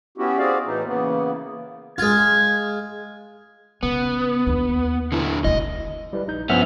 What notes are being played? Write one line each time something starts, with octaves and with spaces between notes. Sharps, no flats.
B3 C#4 E4 F#4 G4
C4 F#4 G#4 D5 F5
A2 E3 D#4
C#3 E3 A#3 B3
G#3 F4 G#6
C#3 B3
D#2 D4
D3 E4 F#4
D2 D#3 D#5
G3 E4 B4
A#1 D#4 G6
G2 F3 B3 C#4 E5 F#5 F6